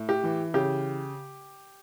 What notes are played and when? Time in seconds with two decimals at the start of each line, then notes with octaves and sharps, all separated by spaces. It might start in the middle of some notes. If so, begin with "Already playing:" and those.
Already playing: A2
0.09 G4
0.24 E3
0.54 C#3 G4